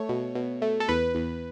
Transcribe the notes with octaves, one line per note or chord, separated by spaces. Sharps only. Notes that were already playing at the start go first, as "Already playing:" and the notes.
Already playing: A3 C#5
B2
B2
A3
A4
E2 B4
E2